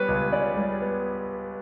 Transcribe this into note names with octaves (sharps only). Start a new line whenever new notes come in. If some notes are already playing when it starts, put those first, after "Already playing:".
Already playing: G3 B3 B4 C#5
C#2
C#3 D5
G3
B3